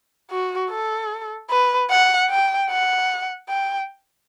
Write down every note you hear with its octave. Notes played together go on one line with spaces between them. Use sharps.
F#4
A4
B4
F#5
G5
F#5
G5